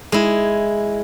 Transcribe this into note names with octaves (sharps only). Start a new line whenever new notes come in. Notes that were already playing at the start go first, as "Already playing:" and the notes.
G#3 E4